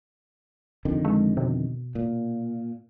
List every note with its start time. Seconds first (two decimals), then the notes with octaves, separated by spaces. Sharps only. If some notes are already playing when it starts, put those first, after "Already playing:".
0.85 F2 D3 D#3
1.05 G#3
1.37 B2
1.95 A#2